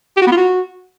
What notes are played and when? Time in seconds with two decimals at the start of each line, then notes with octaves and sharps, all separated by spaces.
0.17 G4
0.22 F#4
0.27 B3
0.32 F4
0.37 F#4